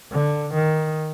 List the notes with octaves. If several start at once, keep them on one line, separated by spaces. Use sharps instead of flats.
D3
D#3